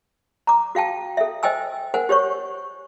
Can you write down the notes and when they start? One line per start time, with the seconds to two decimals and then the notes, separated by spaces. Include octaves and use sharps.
0.47 A#5 D6
0.75 F#4 F5 G5 A5
1.17 A4 E5
1.43 C5 D#5 G5 G#5 E6
1.94 A#4 C5 F#5 G#5
2.09 G4 C5 C#5 C#6